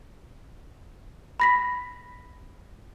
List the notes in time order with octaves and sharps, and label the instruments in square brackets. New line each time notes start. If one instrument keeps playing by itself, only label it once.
[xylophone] B5 A#6 B6